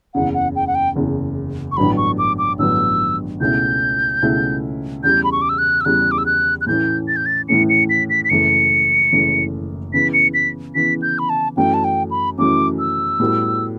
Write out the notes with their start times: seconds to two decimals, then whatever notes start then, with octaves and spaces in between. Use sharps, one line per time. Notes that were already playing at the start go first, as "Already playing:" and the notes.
0.14 F#1 E2 C#3 F#5
0.34 F#5
0.56 G5
0.67 F#5
0.75 G5
0.95 F#1 E2 C#3
1.72 C#6
1.77 A1 G2 D3 F#3 B3 B5
1.97 C#6
2.19 D6
2.38 D6
2.59 A1 G2 D3 F#3 B3 E6
3.41 C#2 B2 A3 C#4 E4 G6
4.22 C#2 B2 A3 C#4 E4
5.04 E2 C#3 G3 G6
5.24 B5
5.32 C#6
5.42 D6
5.49 E6
5.58 F#6
5.81 E6
5.85 E2 C#3 G3 F#6
6.11 D6
6.18 E6
6.26 F#6
6.61 F#6
6.66 A2 E3 A3 C#4 G6
7.08 A6
7.16 G6
7.26 A6
7.49 A2 E3 A3 C#4 C#7
7.70 C#7
7.90 B6
8.10 B6
8.25 B6
8.30 F#1 F#2 E3 A3 C#7
9.12 F#1 F#2 E3 A3
9.93 C#3 E3 B3 B6
10.14 C#7
10.34 B6
10.75 C#3 E3 B3 B6
11.02 G6
11.19 B5
11.29 A5
11.56 F#2 E3 A3 C#4 F#4 G5
11.74 A5
11.84 G5
12.11 B5
12.38 F#2 E3 A3 C#4 F#4 D6
12.79 E6
13.20 A2 G3 B3 F#4 A4